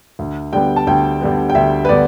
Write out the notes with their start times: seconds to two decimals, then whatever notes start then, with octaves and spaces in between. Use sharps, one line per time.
0.19 D2
0.53 D3 G3 B3 G5
0.76 A5
0.87 D2 G5
1.21 D3 G3 B3
1.50 G5
1.55 D2 E5
1.85 B4
1.89 D3 G3 B3 D5